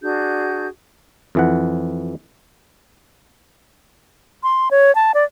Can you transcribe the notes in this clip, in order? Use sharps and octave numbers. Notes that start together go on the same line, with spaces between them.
D4 F#4 G#4 G6
F2 E3 F#5
C6
C#5
A5
D5